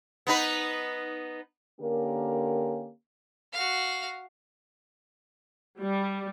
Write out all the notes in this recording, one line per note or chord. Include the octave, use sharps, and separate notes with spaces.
B3 D#4 B4
D3 A#3 C#4 G4 A#4
F#4 F5
G3